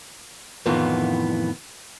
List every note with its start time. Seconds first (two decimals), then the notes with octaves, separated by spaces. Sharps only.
0.66 F2 A2 D#3 E3 B3 F4